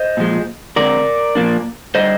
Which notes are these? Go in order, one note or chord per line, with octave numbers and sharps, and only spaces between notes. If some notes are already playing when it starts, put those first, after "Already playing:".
Already playing: C5 D#5
A#2 F3 G#3
D3 G#3 C4 A#4 D5
A#2 F3 A#3 D4
D3 G3 C5 D#5